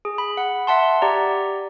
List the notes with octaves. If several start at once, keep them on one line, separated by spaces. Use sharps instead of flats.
G#4
B5
F#5
E5 F#5 A5 C6
G4 D5 A#5